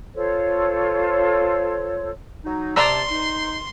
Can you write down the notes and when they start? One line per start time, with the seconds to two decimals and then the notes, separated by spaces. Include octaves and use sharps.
0.14 F4 A4 C5 C#5
2.45 F#3 D#4
2.76 C3 C5 D5 A5 A#5 C6 E6
3.11 D#4